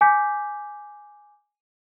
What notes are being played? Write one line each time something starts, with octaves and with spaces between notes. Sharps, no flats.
G#5 D6 G6 B6